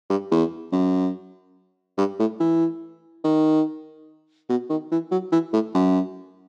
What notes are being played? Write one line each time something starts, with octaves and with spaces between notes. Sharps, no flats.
G2
E2
F#2
G2
A2
E3
D#3
B2
D#3
E3
F#3
E3
A2
F#2